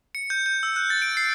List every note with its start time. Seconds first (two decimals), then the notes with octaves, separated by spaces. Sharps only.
0.15 C#7
0.30 G6
0.46 G6
0.63 E6
0.76 F#6
0.90 A6
1.02 D7
1.17 C7